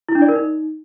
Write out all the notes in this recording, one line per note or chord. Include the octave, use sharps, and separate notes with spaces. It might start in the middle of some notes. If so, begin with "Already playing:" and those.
E4
D4
D5
A#4
D#4